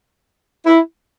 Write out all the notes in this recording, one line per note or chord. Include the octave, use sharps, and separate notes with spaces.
E4